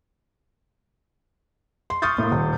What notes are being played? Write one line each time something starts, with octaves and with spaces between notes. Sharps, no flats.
C6
C6 C#6 D#6 F6 G6 A6
A2 A#3
D#1